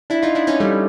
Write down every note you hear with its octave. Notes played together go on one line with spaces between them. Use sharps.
D4 E4
D#4 F4
D4 E4
C#4 D#4
G3 A3